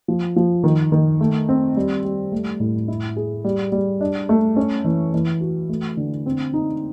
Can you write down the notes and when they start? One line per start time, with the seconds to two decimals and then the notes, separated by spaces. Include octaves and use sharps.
0.08 F3
0.36 F3
0.64 D#3
0.92 D#3
1.21 A3
1.49 C4
1.77 G3
2.05 G3
2.32 A3
2.60 A2
2.88 E4
3.17 G#4
3.44 G3
3.72 G3
4.01 D4
4.29 A3
4.56 C#4
4.85 E3
5.14 E3
5.41 F#4
5.69 A3
5.97 D3
6.26 C4
6.54 D#4